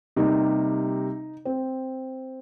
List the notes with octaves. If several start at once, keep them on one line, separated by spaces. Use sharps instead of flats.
C3 G3 A#3 D#4
C4